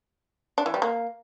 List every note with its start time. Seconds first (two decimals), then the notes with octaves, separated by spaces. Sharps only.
0.58 D4
0.66 E3
0.74 G3
0.82 A#3